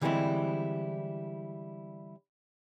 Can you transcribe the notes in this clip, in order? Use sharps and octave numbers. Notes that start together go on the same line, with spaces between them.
D3 E3 G3 G#3 C4 E4